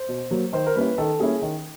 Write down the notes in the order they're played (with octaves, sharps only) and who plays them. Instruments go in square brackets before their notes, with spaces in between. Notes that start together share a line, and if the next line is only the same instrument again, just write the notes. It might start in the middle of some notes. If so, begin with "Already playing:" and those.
Already playing: [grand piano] C5
B2
F#3 A#3
D#3 C5
A#4
G3 A#3 C#4 E4 B4
D#3 A4
G3 A#3 C#4 E4 G#4
D#3